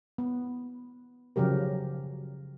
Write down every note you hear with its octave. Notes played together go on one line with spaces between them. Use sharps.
B3
C#3 F3 F#3 G4 A#4